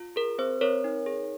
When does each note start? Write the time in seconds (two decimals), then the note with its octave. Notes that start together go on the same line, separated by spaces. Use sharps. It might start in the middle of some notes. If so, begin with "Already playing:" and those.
Already playing: F4
0.16 G#4 A#4
0.38 C4 C5
0.61 C4 A#4 C#5
0.84 D#4
1.06 G#4